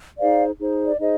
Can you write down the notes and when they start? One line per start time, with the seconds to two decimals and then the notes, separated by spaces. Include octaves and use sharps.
0.18 D#4 G#4 C5 D5 F5
0.59 D#4 G#4 C5
0.86 D5
1.00 D#4 G#4 C5 D#5